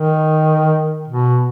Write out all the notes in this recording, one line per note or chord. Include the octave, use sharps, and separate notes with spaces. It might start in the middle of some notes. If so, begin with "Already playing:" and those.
Already playing: D#3
B2